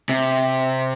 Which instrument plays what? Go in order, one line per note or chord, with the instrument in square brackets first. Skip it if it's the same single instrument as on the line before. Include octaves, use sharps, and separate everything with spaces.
[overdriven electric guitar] C3